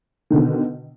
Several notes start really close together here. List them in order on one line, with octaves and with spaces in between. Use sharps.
D#3 D3 B2